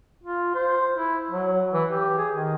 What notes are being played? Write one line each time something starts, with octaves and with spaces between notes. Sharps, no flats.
F4
C5
E4
F#3
E3
G4
G#4
D#3